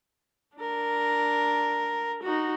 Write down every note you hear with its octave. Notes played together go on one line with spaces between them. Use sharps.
D4 A#4
D#4 F#4